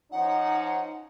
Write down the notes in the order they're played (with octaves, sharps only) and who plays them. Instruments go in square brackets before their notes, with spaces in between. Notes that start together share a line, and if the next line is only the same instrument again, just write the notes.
[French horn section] F3 C#4 D#4 [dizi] F#5